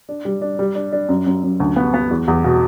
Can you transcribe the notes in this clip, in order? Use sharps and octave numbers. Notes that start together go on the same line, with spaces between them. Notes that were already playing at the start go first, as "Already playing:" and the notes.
D4
G3
D4
G3
D4
D4
F#2
F#2
F#2
D2
B3
B3
E2
E2
B2